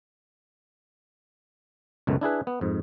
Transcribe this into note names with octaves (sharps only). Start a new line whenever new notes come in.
C#2 F#2 B2 A3
D4 E4 G#4 B4
B3
F2 G#2